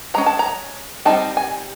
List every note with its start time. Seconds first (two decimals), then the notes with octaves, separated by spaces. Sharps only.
0.14 F3 G#3 C#4 A#5
0.26 A5
0.39 A#5
1.05 G3 C4 D#4 A5
1.37 G#5